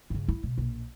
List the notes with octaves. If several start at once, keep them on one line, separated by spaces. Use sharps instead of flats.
G2 C#3
E4
B2
A#1